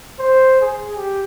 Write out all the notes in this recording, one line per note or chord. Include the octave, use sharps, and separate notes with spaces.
C5
G#4
G4